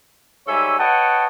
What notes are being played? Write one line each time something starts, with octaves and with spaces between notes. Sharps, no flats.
G#2 G3 A4 C#5 E5 G#5
B4 C#5 D#5 F#5 G5 A5